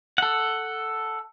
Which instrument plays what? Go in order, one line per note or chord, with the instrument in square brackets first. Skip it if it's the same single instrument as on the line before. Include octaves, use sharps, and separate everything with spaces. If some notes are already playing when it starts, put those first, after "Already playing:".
[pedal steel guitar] A4 F#5